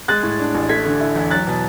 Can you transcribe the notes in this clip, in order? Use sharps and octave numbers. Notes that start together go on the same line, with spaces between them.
G#3 F#6 A6
A2
D4
A1
A3 G#6 B6
D3
E4
E2
F#3 F#6 A6
B2